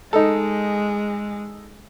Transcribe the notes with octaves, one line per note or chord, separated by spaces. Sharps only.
G#3 D#4 A4